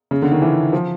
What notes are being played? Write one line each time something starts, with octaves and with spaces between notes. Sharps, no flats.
C#3
D3
D#3
E3
F3